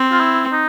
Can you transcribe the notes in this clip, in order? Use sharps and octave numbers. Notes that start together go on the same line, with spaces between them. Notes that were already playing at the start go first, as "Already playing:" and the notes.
Already playing: C4
F4
E4
D#4